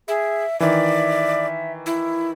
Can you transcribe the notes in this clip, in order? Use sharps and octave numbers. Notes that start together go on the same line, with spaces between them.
G#4 E5
D#3 E3 D5 E5
E4